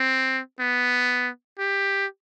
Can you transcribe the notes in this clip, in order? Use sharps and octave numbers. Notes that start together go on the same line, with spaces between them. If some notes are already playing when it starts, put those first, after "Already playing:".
Already playing: C4
B3
G4